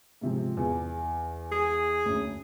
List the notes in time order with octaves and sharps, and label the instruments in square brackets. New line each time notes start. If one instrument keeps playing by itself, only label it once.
[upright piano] G#2 C3 F3
E2
[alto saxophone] G#4
[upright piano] F#1 D2